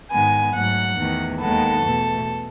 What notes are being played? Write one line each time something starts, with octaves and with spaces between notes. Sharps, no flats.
G#2 D#3 G#3 B3 G#5
G#2 F#3 A3 F#5
E2 D#3 A3
D#2 D#3 G#3 B3 A4
E2 B2 A3